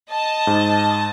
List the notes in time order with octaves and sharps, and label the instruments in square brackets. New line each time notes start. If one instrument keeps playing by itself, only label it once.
[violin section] D#5 A5
[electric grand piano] G#2